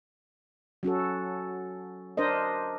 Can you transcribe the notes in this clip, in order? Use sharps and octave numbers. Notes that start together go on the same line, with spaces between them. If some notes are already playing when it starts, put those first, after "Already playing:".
F#3 C#4 F#4 A4
D4 A#4 C5 D#5